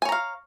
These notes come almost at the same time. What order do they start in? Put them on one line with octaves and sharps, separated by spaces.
G#5 C#5 A#5 F5